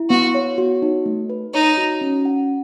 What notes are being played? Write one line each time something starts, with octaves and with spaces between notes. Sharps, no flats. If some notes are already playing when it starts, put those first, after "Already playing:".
Already playing: E4
B3 F#4
C#5
F#4
D#4
A3
B4
D#4 C#5
F#4
C#4
F#5